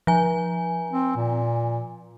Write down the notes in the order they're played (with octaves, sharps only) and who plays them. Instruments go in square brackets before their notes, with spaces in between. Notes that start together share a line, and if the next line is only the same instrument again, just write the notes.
[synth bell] F3 G#5
[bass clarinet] C4
A#2